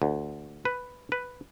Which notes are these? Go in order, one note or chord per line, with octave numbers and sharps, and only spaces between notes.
D2
B4
B4